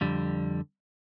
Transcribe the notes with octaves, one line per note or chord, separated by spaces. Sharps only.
F2 D3 G3